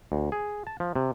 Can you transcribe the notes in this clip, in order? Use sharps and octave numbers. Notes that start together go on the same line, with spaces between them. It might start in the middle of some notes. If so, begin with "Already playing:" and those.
D2
G#4
A5
F3
C3